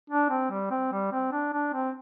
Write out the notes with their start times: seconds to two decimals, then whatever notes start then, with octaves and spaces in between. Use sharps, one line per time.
0.10 D4
0.30 C4
0.50 G3
0.71 C4
0.92 G3
1.12 C4
1.32 D4
1.54 D4
1.73 C4